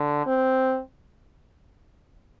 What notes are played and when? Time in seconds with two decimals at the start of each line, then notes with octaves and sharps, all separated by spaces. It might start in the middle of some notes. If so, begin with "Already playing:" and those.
Already playing: D3
0.26 C4